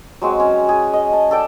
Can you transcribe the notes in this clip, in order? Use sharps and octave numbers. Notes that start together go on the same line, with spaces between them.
F#3 G#3 C4 F#4
C#4
G#4
D#5
A5
A4 D5 G5